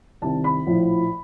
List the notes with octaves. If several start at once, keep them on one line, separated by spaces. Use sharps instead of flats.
C2 C3 D#3 A5
B5
A#1 A2 F3